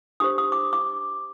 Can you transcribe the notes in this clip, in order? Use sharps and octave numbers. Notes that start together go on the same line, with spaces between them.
D4 G4 C5 D#6
D#6
D6
D6